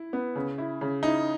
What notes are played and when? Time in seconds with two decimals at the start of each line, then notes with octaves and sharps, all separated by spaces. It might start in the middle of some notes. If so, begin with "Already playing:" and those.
Already playing: E4
0.13 B3
0.35 C#3
0.58 E4
0.81 C#3
1.03 D#4 E4